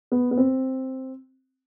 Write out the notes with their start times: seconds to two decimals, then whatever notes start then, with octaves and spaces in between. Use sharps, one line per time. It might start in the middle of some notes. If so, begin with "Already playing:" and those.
0.12 B3
0.31 B3
0.37 C4